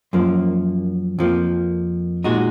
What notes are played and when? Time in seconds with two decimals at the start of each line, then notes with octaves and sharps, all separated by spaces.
0.13 F#2 F3 A#3
1.19 F2 F3 A#3
2.24 A#2 G#3 D#4 F#4